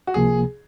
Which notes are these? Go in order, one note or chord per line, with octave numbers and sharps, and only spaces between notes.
F#4
C#2 C3 F3 A#3 G#4